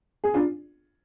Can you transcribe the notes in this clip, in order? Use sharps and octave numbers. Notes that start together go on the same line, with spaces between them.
G#4
D4 F4